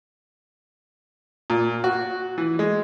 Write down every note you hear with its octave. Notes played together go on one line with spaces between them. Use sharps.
A#2
F#4
E3
G#3